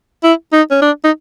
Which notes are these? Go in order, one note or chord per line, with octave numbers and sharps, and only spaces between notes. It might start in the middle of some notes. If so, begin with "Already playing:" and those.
E4
D#4
C#4
D4
D#4